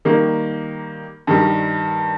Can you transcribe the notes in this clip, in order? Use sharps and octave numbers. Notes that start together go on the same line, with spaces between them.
D#3 G3 A#3
G2 D#3 G3